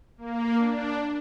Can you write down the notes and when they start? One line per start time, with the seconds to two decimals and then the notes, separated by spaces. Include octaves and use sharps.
0.18 A#3
0.58 D4